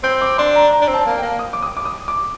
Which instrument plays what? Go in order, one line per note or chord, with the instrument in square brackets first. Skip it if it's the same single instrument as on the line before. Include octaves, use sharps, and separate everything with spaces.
[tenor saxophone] C4 [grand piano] G6
[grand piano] D6
[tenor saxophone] D4 [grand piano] C6
[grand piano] A#5
A#5
[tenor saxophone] D4
C4
[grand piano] A5
[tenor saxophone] A#3
[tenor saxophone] A#3 [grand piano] G5
[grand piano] D#6
D6
D#6
D6
D#6
D6